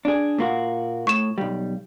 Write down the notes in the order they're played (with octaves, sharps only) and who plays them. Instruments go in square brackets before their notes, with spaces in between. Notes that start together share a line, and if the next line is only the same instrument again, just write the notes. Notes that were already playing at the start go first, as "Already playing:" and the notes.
[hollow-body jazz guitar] D4 G#4
A#2 A#3 F#4
[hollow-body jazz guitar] A2 [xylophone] C#6 E7
[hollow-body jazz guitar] B1 G3